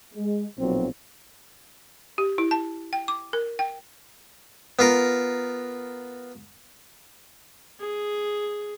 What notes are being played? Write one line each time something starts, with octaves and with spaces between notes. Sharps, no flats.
G#3
B1 A#2 F3 F#3 C4
G4
E4
A5
G5
D6
A#4
G5
B3 F4 A#4
G#4